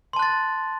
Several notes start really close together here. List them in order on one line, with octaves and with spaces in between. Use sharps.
C6 A5 F#6 A6